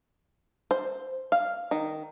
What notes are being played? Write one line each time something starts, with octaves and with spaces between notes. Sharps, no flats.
C5
F5
D#3